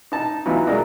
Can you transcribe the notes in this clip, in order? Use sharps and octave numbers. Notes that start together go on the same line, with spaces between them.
D#4 A5
E3 F#3 B3 D#4 F4 B4
F#3 G#3 A3 A#4 D5 D#5